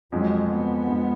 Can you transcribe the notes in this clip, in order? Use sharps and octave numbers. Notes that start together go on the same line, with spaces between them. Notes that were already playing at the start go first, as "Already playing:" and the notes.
F2 F3 F#3 G#3
B3
F2 F3 G#3